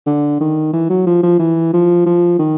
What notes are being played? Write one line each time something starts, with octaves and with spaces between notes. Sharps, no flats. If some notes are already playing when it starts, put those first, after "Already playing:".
D3
D#3
E3
F#3
F3
F3
E3
F3
F3
D#3